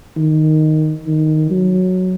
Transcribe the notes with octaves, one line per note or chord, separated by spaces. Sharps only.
D#3
D#3
F#3